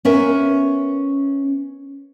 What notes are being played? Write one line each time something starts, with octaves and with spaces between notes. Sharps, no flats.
B3 C#4 A#4 E5